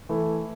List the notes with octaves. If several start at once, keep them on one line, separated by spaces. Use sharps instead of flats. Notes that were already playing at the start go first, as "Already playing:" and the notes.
E3 A3 E4 A4